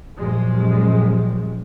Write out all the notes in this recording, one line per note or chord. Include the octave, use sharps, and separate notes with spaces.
F#2 A#2 F3 G3 G#3